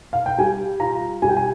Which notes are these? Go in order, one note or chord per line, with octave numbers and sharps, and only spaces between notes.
F5
G5
G3 G#5
F4 A#5
G3 G#5
G5
G#5